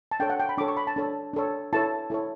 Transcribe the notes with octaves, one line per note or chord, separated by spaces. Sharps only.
A5
D4 A4 C#5 G5
F#5
G5
B5
D4 A4 C#5 D6
C#6
B5
A5
D4 A4 C#5
D4 A4 C#5
E4 A4 C#5 A5
E4 A4 C#5